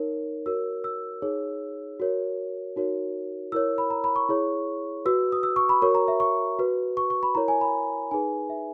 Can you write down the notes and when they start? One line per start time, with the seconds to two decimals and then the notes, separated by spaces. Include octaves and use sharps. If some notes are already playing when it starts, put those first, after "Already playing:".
Already playing: D#4 A#4 C#5
0.46 F#4 A#4 C#5 E6
0.84 E6
1.22 D#4 G#4 C#5
2.00 F#4 A#4 C#5
2.76 D#4 F#4 A#4 C#5
3.52 E4 A#4 C#5 E6
3.78 B5
3.90 A#5
4.04 B5
4.16 C#6
4.29 E4 G#4 C#5
5.05 F#4 B4 E6
5.32 D#6
5.43 E6
5.56 C#6
5.69 B5
5.82 F#4 A#4 C#5 C#6
5.95 A#5
6.08 E5
6.20 C#6
6.59 F#4 B4
6.97 C#6
7.10 C#6
7.23 B5
7.35 E4 A#4 C#5 A#5
7.48 G#5
7.61 B5
8.11 D#4 G#4 B4 G#5
8.50 E5